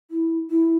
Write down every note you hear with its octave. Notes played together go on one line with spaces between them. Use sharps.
E4
E4